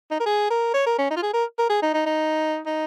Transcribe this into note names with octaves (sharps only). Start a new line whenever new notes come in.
D#4
A#4
G#4
A#4
C#5
A#4
C#4
D#4
F4
G#4
A#4
A#4
G#4
D#4
D#4
D#4
D#4